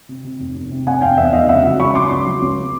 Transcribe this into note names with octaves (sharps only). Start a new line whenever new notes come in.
C3
C3
F1
F1
C3
F1 F#5 G#5
F1 F5 G5
E2 E5 F#5
F1 D#5 F5
C#2 E5 F#5
F#3
C#2 B5 C#6
F#3 C6 D6
C#2
F#3
C#2